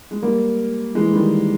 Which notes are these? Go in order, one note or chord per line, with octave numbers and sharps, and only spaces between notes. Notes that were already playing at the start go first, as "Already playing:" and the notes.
G#3
G3 A#3
E3 G#3
D#3 G3